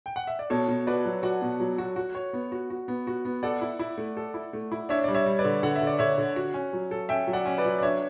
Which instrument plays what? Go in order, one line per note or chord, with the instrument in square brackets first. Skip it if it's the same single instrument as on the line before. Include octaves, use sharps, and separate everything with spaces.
[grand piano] G5
F#5
E5
D5
[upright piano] B2 [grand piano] A4 C#5
[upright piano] B2
[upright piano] F#4 [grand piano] B4 D5
[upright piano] F#3
[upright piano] F#4 [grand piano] D5 F#5
[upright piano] B2
F#3
F#4
F#4
C#5
B3
F#4
F#4
B3
F#4
B3
[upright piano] A4 [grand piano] D5 F#5
[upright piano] E4
E4
A3
A4
E4
A3
E4
[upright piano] D4 [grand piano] C#5 E5
[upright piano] G3 [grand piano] D5
[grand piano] C#5 E5
[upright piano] G3
[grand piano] B4 D5
[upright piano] D3
[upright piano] D3 [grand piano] F#5
[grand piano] E5
[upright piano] D3
[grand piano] D5
[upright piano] D3 [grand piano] C#5 E5
[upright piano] D3
F#4
C#4
F#3
A4
[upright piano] C#4 [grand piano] E5 G5
[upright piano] F#3
[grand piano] D5 F#5
[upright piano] C#4
[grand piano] B4 D5
[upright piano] F#3
[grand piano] D5
[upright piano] D4 [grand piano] C#5 E5